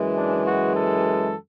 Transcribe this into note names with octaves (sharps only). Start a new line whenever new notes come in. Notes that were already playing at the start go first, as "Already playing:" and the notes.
Already playing: F#2 E3 G#3
D4
F#4
A4